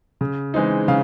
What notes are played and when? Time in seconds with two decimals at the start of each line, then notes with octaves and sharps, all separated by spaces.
0.21 C#3
0.54 E3 G#3 C4 D#4
0.88 C#3 F5